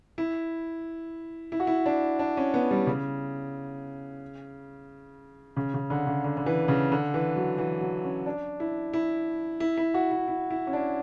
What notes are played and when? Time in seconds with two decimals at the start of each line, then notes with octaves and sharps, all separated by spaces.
0.18 E4
1.52 E4
1.60 F#4
1.67 E4
1.86 D4
2.19 D4
2.37 C#4
2.54 B3
2.71 G3
2.87 C#3
5.56 C#3
5.74 C#3
5.90 D3
6.07 C#3
6.24 D3
6.37 D3
6.46 E3
6.68 C#3
6.92 D3
7.14 E3
7.36 F#3
7.58 E3
7.81 F#3
8.04 C#4
8.26 D4
8.60 E4
8.93 E4
9.60 E4
9.77 E4
9.94 F#4
10.12 E4
10.28 E4
10.50 E4
10.67 C#4
10.73 D4